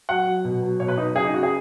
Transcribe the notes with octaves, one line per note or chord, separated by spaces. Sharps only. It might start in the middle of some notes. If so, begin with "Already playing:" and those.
F#3 F#5
F#3
B2
F#3
B2 C#5
B4
F#3 D#4
C#3 G#4
D#4
C#3 F#4
G#4